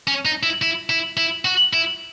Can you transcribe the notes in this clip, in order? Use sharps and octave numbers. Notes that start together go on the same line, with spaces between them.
C#4
D#4
E4
E4
E4
E4
F#4
E4